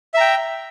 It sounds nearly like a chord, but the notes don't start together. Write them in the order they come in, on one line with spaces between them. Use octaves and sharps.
E5 A#5 G5